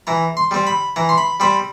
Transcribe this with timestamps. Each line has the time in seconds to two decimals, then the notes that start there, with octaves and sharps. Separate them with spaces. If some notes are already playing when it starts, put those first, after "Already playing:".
0.07 E3 A#5
0.37 C6
0.51 G3 C4
0.67 B5
0.96 E3 A#5
1.09 C6
1.18 B5
1.40 G3 C4 B5